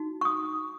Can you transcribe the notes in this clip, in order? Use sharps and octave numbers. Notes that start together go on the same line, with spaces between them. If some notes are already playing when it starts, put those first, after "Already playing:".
Already playing: D#4 F#4
C#6
D#6